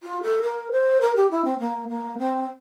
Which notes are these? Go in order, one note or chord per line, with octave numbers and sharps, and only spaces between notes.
F4
A4
A#4
C5
A#4
G4
E4
C4
A#3
A#3
C4